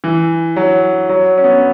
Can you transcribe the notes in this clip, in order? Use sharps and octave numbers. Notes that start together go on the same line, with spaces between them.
E3
F#3
F#3
C#4
B3